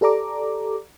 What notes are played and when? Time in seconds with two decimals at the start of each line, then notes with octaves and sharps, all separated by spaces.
0.01 G4 A4 D5 A#5 D6